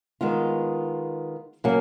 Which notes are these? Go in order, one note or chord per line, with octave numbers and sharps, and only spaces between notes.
D#3 G#3 B3 F4
C#3 F#3 A#3